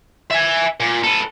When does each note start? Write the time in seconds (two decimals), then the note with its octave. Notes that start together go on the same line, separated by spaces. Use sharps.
0.31 E5 G#5
0.80 A#2
1.03 A4 B4